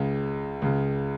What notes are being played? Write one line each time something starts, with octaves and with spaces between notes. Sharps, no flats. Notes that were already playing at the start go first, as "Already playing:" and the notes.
Already playing: C#2 C#3
C#2 C#3